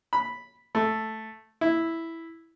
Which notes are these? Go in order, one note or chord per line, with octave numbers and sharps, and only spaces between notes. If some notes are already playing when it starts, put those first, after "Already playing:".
B5
A3
E4